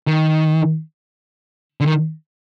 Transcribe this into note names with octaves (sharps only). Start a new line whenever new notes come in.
D#3
D3
D#3